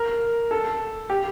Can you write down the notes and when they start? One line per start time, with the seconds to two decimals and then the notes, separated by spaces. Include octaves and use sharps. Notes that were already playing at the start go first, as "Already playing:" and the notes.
Already playing: A#4
0.51 A4
1.10 G4